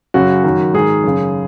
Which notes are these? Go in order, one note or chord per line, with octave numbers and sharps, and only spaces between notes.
F#2 C#3 F#4
F#2 D#3
G#2 D#3 G#4
F#2 C#3